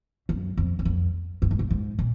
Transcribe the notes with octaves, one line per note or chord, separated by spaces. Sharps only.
F#2
F2
F#2
F2
G2
G#2
G2
G#2
A#2